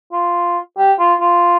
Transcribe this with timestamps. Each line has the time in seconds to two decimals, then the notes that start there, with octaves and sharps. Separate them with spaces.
0.13 F4
0.78 G4
0.99 F4
1.21 F4